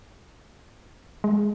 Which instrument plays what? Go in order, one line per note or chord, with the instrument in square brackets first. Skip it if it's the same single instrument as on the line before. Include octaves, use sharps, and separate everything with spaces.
[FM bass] G#3